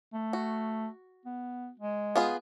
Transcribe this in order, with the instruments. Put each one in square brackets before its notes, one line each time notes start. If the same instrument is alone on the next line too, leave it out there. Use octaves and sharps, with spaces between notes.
[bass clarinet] A3
[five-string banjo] F#4
[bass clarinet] B3
G#3
[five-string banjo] B3 F4 G#4